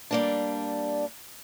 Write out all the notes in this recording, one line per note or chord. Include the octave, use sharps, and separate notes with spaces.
G3 A#3 D4